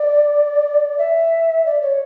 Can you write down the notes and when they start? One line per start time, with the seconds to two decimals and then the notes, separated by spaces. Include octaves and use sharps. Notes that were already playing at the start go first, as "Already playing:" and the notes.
Already playing: D5
0.98 E5
1.66 D5
1.82 C#5